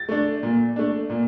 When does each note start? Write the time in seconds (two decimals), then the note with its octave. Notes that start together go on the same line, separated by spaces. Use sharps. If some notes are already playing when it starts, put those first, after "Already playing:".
Already playing: A6
0.09 A3 D4
0.43 A#2
0.76 A3 D4
1.10 A#2